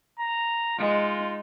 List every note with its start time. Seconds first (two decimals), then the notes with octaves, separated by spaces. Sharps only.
0.20 A#5
0.78 G#3 D#4 F4